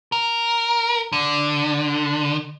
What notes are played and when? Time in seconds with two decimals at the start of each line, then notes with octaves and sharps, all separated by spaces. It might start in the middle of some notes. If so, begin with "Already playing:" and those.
0.12 A#4
1.13 D3